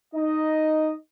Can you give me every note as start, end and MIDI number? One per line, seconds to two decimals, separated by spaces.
0.14 0.92 63
0.14 0.92 75